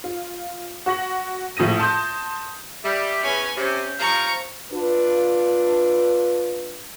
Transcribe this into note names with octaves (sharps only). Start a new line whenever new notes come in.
F4
F#4 C#6 A#6 F#7
A#1 A2 D#6 A#6 D#7
A5 C6 D#6 G6
G3 E5
E2 C#4 B4 G#5
C3 C#4 C5
F3 G3 F5 A#5 C#6
D4 F4 B4